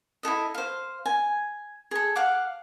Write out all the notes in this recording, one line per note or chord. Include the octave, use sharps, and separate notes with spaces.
E4 F4 A4 D#5
C5 F5
G#5
G#4 A4
F5 F#5 D6